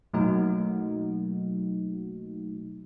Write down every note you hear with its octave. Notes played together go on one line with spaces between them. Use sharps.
B2 F#3 A3 A#3 D#4 F#4